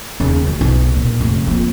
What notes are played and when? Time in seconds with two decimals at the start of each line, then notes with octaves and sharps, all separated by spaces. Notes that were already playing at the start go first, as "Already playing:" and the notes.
0.20 D#2 C#3
0.47 D2
0.61 B1
0.96 A#2
1.21 F1
1.47 F2 A#3